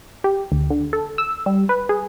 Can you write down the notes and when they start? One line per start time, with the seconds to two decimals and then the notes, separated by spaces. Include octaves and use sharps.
0.24 G4
0.52 D2
0.70 D3
0.93 A4
1.18 E6
1.46 G3
1.69 B4
1.89 G#4